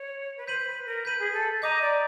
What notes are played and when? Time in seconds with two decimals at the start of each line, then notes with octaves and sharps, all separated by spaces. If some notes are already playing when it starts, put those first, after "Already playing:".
Already playing: C#5
0.37 B4
0.47 C5 G6 B6 D#7 F#7
0.66 B4
0.85 A#4
1.05 B4 G6 B6 D#7 F#7
1.19 G#4
1.33 A4
1.62 D#5 A#5 D6 G6
1.81 D5